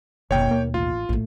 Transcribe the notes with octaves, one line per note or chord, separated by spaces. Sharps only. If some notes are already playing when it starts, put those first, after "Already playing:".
F#1 D#2 B2 C#5 G5
A#3
A1 F4
A#1 A2 A3